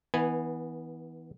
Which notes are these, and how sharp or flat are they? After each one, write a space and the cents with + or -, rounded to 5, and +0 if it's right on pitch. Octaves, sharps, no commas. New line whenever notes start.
E3 -30 B3 +0 G#5 +0